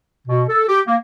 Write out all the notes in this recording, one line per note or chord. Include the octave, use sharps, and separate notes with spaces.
B2
A4
G4
A#3